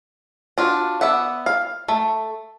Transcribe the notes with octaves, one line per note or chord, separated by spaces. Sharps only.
D4 F4 F#4
B3 D5 E5 F#5
F5
A3